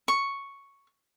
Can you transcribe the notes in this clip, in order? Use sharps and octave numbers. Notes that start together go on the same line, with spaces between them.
C#6